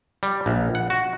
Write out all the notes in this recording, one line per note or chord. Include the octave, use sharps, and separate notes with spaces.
G3
A#1
F#5
F#4